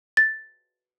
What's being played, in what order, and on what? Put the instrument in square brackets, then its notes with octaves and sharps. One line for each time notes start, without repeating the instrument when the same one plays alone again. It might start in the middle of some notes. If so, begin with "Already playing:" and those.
[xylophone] A6